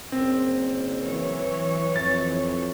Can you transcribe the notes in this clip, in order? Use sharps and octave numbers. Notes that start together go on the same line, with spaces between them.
F#1 C4
E3 F#3 C#5
F2 A6